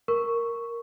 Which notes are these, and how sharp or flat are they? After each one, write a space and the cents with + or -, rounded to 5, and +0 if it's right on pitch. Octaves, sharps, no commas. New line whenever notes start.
A#4 +0 C#6 +0